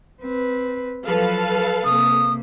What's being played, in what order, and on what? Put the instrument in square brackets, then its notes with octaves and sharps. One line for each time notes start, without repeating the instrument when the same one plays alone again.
[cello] C4 B4
[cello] F3 F#3 [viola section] A4 B4 F5
[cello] C3 A#3 [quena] D#6